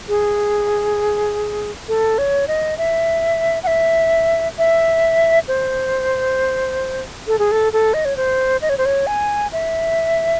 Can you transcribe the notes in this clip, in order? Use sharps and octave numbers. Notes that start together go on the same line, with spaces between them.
G#4
A4
C#5
D#5
E5
F#5
E5
E5
C5
A4
G#4
A4
A4
D#5
C#5
C5
D#5
C#5
C5
C#5
G#5
E5